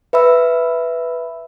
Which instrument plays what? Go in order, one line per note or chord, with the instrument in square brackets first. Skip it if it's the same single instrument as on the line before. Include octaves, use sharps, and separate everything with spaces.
[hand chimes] B4 E5 B5 E6